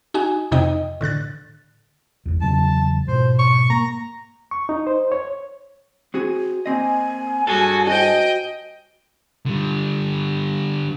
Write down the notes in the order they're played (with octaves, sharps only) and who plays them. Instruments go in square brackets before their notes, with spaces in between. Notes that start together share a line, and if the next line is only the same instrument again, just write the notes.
[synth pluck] D#4 F#4 G#5
F2 C3 D#4 D#5 G5
A2 D3 F#6 A6
[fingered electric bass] G1 E2
[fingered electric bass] E2 C#3 F#3 [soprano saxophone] A5
[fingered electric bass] G#2 B2 [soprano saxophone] C5
[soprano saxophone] C#6
[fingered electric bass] A#3 [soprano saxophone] A#5
[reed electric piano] C#6
D#4
C5
C#5
[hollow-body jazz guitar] C4 F#4 G#4
[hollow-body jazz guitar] A#3 C4 D#5 [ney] G#5
[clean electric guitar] G2 G#4 A4 [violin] F#4
[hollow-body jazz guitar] F#4 C5 [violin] D#5 G5
[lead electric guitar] D3 G3